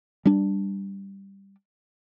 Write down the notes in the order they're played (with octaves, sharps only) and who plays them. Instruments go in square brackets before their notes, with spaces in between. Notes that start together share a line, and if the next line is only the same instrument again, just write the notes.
[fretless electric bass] G3 D4